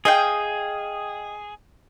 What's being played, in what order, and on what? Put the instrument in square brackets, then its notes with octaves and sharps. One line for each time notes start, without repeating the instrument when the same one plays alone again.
[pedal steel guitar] G#4 [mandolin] D#5 F5 G5